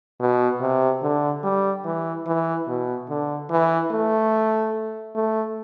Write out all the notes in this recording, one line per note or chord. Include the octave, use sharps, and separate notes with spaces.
B2
C3
D3
G3
E3
E3
B2
D3
E3
A3
A3